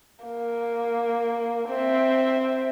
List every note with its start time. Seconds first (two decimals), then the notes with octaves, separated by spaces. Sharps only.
0.25 A#3
1.69 C4 E5